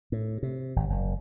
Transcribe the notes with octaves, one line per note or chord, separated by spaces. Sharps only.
A2
C3
G#1
F#1